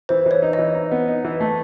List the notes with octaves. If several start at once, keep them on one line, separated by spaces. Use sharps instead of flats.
E3 C5
E3 C#5
D#4
D#5
E3
D#4
B3
D#4
E3
A3